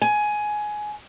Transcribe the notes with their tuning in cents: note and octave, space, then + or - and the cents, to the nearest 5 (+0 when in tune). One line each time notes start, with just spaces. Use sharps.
G#5 +15